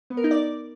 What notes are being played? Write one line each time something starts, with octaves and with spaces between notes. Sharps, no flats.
B3
A#4
D#4
D5